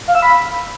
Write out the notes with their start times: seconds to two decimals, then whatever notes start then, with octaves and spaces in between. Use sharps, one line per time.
0.07 F5
0.15 E6
0.22 B5